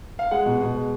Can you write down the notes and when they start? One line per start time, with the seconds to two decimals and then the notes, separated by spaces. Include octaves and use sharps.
0.19 F5
0.31 G#3 F#5
0.46 B2
0.61 B2
0.75 G#3